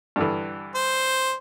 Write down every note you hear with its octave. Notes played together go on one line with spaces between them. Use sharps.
G2 D3 E3
C5